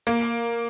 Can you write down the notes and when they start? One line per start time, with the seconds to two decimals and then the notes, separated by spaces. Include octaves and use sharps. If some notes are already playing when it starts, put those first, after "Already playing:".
0.07 A#3